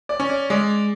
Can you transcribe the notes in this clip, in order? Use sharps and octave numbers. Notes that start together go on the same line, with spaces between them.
D5
C#4
D5
G#3 D5